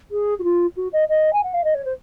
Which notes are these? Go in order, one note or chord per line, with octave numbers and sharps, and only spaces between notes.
G#4
F#4
F4
F#4
D#5
D#5
G#5
F#5
F5
D#5
C#5
C5